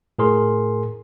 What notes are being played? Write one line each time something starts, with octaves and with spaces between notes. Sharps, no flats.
A2 G#4 A#4 C6